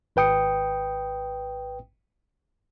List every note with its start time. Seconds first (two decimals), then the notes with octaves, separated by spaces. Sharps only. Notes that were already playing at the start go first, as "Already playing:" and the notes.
0.16 G#1 B4 G5 D#6 C#7